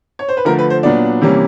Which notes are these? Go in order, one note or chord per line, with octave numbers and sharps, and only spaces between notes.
C#5
C5
B4
D3 F3 A3 A#4
B4
C5
A#2 F#3 B3 D4 D5
C3 E3 G3 A#3 C#4